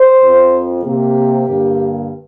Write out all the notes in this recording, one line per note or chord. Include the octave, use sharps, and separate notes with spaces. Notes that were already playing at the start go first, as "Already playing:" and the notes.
Already playing: C5
F2 F3 C4
C3 A#3 G4
G2 D3 A#3